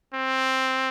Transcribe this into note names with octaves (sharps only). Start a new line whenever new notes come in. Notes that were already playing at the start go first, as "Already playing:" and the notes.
C4